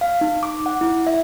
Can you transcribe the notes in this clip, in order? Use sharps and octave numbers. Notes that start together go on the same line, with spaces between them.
F5
D#4
D6
F#5
E4
E5